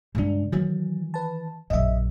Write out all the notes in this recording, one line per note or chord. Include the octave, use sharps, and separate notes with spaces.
G2 C#3 G#3 D4
D#3 E3 F#3
B4 A5
A#1 F#2 D#5 E5